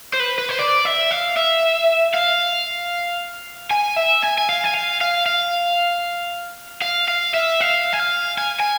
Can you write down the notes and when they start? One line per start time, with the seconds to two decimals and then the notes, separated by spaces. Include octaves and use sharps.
0.13 C5
0.20 B4
0.38 B4
0.49 C5
0.59 D5
0.85 E5
1.11 F5
1.37 E5
2.14 F5
3.71 G#5
3.97 E5
4.23 G#5
4.38 G#5
4.49 F5
4.64 G#5
4.74 F5
5.01 F5
5.26 F5
6.82 F5
7.08 F5
7.34 E5
7.61 F5
7.93 G#5
8.00 F5
8.38 G#5
8.60 G#5